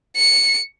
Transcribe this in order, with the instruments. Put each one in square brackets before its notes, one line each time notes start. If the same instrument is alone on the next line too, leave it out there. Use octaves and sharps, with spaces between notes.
[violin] C#7